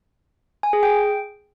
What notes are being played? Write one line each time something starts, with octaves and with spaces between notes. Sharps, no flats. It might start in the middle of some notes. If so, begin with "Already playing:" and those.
G#5
G#4
G5